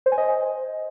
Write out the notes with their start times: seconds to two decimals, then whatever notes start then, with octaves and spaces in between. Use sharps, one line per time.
0.06 C5
0.12 G#5
0.18 D#5